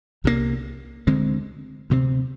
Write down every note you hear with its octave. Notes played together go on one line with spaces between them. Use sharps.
C2 C3 F3 A#3
D2 D3 G#3 C4
D2 C3 G3 C4